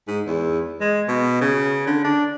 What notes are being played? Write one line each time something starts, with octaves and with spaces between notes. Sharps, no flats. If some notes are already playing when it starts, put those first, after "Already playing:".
G#2
E2
G#3
B2
C#3
D3
D4